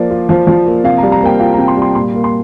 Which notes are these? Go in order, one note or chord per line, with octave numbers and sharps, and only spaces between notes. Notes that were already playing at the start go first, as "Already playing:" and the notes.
Already playing: F3 A#3 D5
F4
F3
F3
A#3
C3 F5
G3 A#5
A#5
A#3 G5
F4 F5
C3 A#5
C6
G3
C6
A#2 C6
A#3
C6